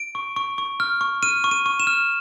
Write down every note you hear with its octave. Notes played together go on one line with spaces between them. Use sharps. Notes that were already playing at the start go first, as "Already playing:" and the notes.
Already playing: D7
C#6
C#6
C#6
F6
C#6
F6 D#7
C#6
D#7
C#6
E7
F6